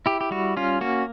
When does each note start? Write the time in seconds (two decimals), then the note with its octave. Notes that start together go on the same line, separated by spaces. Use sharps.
0.06 E4 G4
0.21 G4
0.31 G3 F#4
0.57 C#4 F4
0.81 A#3 F#4